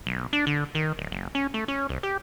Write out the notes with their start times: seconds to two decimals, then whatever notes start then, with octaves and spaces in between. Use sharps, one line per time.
0.06 B1
0.33 D4
0.47 D3
0.75 D#3
0.98 D1
1.11 F#1
1.35 C#4
1.54 A3
1.68 C#4
1.89 C2
2.03 G4